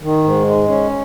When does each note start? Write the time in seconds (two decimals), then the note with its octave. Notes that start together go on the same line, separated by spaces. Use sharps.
0.02 D#3
0.24 G#2
0.47 G#3
0.68 C#4